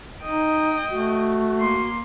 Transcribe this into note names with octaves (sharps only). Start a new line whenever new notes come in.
D#4 D#5 G5
A3 F#4
A#3 C6